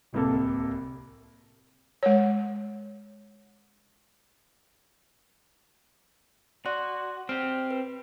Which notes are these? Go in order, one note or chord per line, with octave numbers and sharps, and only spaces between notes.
D1 C2 C3 A#3 A4
G#3 C#5
F#4 D5 C6 F#6
C4 G4 F6
B4